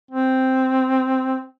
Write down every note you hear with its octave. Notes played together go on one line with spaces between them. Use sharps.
C4